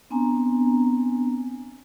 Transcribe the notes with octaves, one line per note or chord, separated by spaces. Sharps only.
B3 C4 D4 G#5 A#5